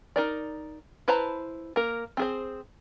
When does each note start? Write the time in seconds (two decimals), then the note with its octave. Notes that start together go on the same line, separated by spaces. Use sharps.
0.16 D#4 A#4 D5
1.08 E4 B4 C5 A5 A#5
1.76 A#3 A#4
2.17 C4 G#4 C5